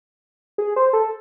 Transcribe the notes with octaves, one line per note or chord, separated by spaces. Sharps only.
G#4
C5
A4